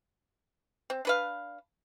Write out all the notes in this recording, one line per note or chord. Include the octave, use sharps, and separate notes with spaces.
C4
D4 B4 F5